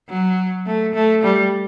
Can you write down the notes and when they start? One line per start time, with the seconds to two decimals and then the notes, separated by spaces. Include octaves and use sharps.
0.09 F#3
0.66 A3
0.94 A3
1.24 G3